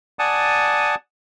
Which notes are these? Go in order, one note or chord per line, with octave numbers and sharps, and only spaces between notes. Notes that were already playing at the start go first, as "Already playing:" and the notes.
D5 F#5 G#5 A5 D#6